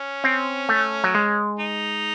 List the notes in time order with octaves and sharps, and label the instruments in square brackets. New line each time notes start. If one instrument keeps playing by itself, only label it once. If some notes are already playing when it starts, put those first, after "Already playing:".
Already playing: [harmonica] C#4
[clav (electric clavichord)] C4
A3
F#3
G#3
[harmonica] D#4